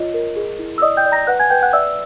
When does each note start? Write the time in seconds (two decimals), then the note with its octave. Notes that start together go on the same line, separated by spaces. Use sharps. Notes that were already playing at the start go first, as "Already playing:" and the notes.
Already playing: F4 C#5 D#5
0.14 A#4
0.36 G#4
0.59 E4
0.78 E6
0.82 D5 D#5 D#6
0.97 G5 G6
1.06 D5
1.12 A#5 A#6
1.27 B4 F#5 F#6
1.40 G#5 G#6
1.50 B4 G5 G6
1.62 F#5 F#6
1.73 D5 E5 E6